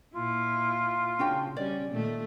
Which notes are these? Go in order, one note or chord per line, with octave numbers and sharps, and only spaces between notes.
A#2 E4 F4
C#3 D4 F#4 G5
C#3 G3 C#4 D5
A#2 D#3 A3